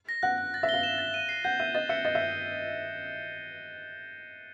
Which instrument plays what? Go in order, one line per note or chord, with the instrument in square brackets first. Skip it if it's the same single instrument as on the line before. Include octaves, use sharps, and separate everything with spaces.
[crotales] A#6
[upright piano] F#5 [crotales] F#6
[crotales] F#6
A6
[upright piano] E5
[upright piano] F5 [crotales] G7
[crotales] E7
A6
D#7
C7
[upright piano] F#5 [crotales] G6
[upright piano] E5 [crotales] D#7
[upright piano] D#5 [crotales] A6
[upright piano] E5 [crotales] C#7
[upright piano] D#5 [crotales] A6
[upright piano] E5